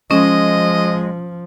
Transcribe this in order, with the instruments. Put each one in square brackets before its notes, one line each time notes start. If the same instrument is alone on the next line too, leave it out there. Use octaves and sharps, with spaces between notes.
[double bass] F3 [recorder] G#3 [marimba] C#4 [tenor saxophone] D#5